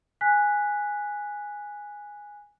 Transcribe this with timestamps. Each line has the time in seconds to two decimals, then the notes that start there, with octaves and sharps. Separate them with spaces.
0.21 G#5 F#6 B6